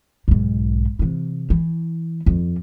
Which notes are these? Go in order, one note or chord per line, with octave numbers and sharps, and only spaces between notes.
B1 G#2
C3 E3
E3
F2